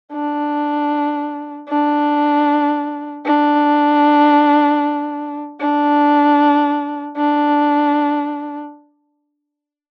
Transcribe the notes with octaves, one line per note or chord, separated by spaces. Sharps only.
D4
D4
D4
D4
D4